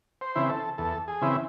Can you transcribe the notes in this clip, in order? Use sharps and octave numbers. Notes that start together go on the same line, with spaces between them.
C5
C#3 E3 C4 E4
A4
E2 A4
G#4
C#3 E3 C4 E4